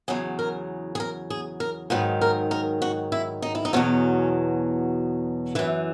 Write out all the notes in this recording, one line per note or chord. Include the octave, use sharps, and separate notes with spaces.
E2 C#3 F#3 G#4
A#4
G#4
A#4
G#4
A#4
G#2 D#3 F#3 B4
A#4
A#4
F#4
E4
D#4
E4
D#4
E2 B2 F#3 C#4
F#2 E3 E4